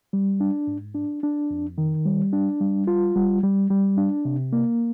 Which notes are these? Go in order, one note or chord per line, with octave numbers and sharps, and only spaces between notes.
G3
D4
G#2
D4
D4
F2
D#3
G3
D4
G3
F4
G3
G3
G3
D4
C3
A#3